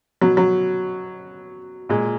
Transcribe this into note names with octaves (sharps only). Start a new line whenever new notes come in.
B2 F#3
F#3
A#2 G#3